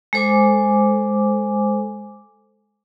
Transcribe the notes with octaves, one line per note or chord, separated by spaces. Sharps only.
G#3 A4 C5 G#5 D6